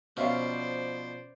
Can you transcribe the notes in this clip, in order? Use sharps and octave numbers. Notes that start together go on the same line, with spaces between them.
B2 F3 C#4 C5 D5 E5 F5